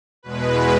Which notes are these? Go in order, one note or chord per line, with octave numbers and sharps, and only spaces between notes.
E2 B2 G#3 B4